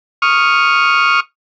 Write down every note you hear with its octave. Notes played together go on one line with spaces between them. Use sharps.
C#6 D#6 F6